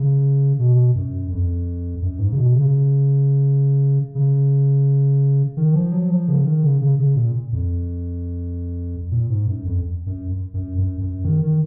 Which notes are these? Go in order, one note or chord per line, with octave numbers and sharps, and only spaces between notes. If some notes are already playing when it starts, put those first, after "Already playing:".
Already playing: C#3
B2
F#2
F2
F#2
G#2
C#3
B2
C#3
C#3
D#3
F3
F#3
F3
C#3
D#3
C#3
C#3
C#3
A#2
F2
A#2
G#2
F#2
F2
F#2
F#2
F#2
F#2
D#3
D#3